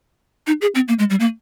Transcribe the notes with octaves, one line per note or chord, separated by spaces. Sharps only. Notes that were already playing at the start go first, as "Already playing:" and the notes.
D#4
G#4
C4
A#3
G#3
G3
A#3